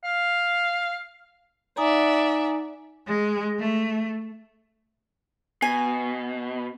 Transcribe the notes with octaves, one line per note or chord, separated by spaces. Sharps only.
F5
D#4 D5 E5 F#5 G#5 A#5
G#3
A3
B2 G#5